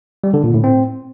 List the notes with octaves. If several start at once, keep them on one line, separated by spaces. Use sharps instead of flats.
G3
D3
A#2
A2
C4